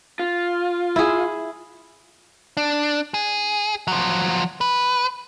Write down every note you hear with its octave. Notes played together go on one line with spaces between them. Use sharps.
F4
E4 G#4
D4
G#4
F3 F#3
B4